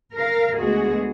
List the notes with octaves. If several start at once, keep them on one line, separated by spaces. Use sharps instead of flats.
A#4 F5
D2 G#3 B3 F#4 G#4